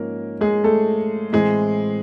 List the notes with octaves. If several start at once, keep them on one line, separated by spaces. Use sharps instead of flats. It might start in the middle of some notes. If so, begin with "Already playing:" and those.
Already playing: G#2 F3 A#3 C#4 A#4
G#3 G#4
A3 A4
A2 E3 G#3 C4 G#4